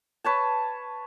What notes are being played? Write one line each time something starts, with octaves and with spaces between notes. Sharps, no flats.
B4 C#5 A5